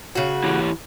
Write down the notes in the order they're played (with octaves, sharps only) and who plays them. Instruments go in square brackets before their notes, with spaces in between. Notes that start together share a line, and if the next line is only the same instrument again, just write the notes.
[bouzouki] C#3 F#4
[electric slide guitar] E3 E4 G4